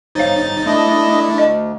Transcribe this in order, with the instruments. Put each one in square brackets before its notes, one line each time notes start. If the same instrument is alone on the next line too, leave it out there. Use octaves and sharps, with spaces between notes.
[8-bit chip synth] G1 D#4 A6 [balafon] C5 C#5 F5
[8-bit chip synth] A3 D4 [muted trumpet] E4 [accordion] D#5
[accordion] D2 [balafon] D#5